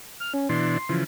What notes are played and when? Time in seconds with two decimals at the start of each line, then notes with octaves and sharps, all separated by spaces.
0.20 F6
0.34 C#4
0.49 B2 E3 D4 C6
0.89 C#3 E3 F3